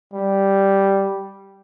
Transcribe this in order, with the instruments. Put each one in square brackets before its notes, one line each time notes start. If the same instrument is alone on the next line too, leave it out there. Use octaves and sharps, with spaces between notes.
[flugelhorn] G3